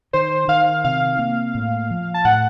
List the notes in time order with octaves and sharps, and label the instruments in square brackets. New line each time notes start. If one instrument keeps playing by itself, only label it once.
[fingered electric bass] D#3 [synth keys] C5
[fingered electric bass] D#3 [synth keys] F5
[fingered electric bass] C3 [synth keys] F5
[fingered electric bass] A#3
A2
F3
[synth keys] A5
[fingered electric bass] A2 [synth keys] F#5